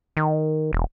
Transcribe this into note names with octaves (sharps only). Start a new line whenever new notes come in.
D#3
E1